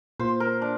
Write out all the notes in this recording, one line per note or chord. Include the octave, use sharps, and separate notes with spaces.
A#2 A#3 F4 C5
A#4
D4